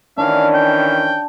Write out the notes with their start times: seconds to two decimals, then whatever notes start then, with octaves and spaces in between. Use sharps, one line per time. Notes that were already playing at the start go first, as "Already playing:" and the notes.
0.18 D#3 E3 C#4 D4 F5
0.54 G5